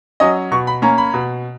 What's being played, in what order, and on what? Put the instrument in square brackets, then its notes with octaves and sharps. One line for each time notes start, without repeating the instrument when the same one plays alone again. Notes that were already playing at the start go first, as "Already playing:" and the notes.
[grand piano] F#3 C#4 D#5
B2 C#6
B5
A#3 C#4 A#5
B5
B2